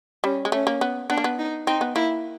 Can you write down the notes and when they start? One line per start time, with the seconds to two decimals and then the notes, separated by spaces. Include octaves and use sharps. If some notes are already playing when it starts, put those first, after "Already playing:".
0.24 G3 C#4
0.45 G#3
0.52 A3 C#4
0.67 A#3
0.81 B3
1.10 B3 D4
1.17 A#3
1.24 B3
1.38 D#4
1.67 C4 D#4
1.81 B3
1.95 A#3 E4